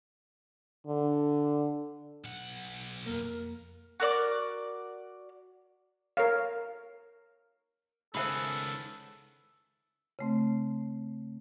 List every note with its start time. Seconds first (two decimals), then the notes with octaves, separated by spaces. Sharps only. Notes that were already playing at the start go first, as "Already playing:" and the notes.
0.87 D3
2.24 B1 F#5
3.06 F2 A#3 A#4
4.00 F#4 A#4 D5 D6
6.17 A#4 C#5 F5
8.15 C#2 D#3 B3 G#4 A4 C5 E5 B5
10.19 C#3 A3 C4